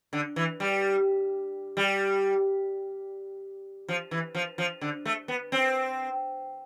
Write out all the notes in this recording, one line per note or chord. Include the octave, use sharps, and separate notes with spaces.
D3
E3
G3
G3
F3
E3
F3
F3
D3
A3
B3
C4